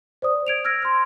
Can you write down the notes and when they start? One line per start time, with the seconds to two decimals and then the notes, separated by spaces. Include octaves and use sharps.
0.22 C5 D5 D#6
0.47 G#6 D7 F7
0.64 E6 F6 G#6 A#6 D7
0.82 C6 F6